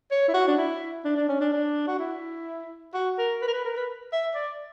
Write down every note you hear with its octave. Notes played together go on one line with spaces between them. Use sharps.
C#5
E4
F#4
D4
E4
D4
D4
C#4
D4
D4
F#4
E4
F#4
A#4
B4
A#4
B4
A#4
B4
E5
D5